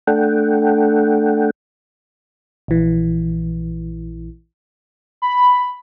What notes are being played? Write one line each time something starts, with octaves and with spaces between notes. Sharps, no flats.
A3 D4 A4 F#5 G5
A#1 E3
B5